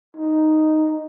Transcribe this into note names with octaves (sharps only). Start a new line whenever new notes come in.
D#4